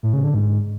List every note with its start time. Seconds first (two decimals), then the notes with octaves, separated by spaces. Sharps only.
0.03 A2
0.13 C#3
0.24 D3
0.34 G#2